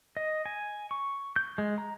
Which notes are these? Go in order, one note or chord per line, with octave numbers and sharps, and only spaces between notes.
D#5
G#5
C#6
G6
G#3
A#5